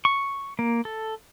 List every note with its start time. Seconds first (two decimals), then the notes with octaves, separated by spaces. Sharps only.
0.05 C#6
0.59 A#3
0.85 A4